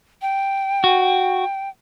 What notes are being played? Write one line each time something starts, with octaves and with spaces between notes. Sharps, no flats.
G5
F#4